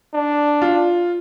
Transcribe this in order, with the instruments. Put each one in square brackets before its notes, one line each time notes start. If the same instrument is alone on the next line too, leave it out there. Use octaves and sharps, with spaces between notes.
[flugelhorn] D4
[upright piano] F4